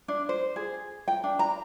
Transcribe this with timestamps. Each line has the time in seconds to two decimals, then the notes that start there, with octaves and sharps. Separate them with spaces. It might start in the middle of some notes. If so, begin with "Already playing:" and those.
0.08 D4
0.29 C5
0.56 G#4
1.08 G5
1.24 D4
1.39 A#5